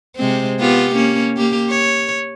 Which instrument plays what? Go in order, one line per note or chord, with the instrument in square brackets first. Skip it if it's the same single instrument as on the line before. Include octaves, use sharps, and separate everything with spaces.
[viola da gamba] C3 G#3 C4
B3 F4 G4
A#3 C#4
A#3 G4
C#5